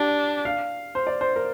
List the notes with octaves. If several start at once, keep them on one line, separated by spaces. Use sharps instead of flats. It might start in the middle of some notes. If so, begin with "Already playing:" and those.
Already playing: D4 G4
F5
C5
D5
C5
A#4